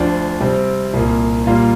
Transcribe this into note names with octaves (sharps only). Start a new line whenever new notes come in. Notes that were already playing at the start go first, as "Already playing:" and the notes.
Already playing: D2 D3 F3 D4
C3 G3 C4
C2 A#2 A#3
A#2 G3 A#3 F4